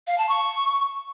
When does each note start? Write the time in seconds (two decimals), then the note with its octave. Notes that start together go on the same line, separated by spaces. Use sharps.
0.07 F5
0.18 A5
0.29 C#6